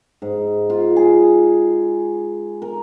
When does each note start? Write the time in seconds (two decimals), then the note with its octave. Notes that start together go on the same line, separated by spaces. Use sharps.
0.22 G#2
0.70 F4
0.96 G#4
2.62 A#4